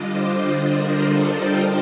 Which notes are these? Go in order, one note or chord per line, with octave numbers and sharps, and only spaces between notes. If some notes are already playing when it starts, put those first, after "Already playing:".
Already playing: D3 G3 D4 F4 D5 D#5
C5
A#4
A4
G5